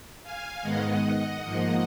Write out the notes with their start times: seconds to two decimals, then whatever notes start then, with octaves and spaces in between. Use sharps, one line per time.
0.23 F5 G#5
0.62 G#2 D#3 G#3 B3 D#5 F#5
1.02 D#5 F#5
1.42 G#2 F3 A#3